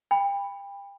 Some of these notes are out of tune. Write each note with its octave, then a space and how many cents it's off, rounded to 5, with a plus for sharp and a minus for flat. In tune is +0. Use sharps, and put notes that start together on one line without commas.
G5 +30 B5 +0